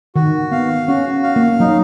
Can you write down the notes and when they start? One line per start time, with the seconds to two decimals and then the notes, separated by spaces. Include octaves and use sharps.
0.15 D#3 F#4
0.52 B3 F5
0.88 C#4 F#4
1.24 F5
1.36 A#3
1.60 F#3 D#4